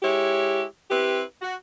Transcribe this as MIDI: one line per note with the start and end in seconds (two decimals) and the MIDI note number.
0.02 0.63 56
0.02 0.63 64
0.02 0.63 67
0.02 0.63 73
0.90 1.22 60
0.90 1.22 64
0.90 1.22 67
0.90 1.22 71
1.42 1.54 66